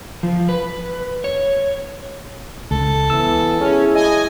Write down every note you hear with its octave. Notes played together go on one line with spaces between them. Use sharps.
F3
B4
C#5
C#2 A4
E3 B3 E6
G#3 C#4 E4 G#4
D#5 G#5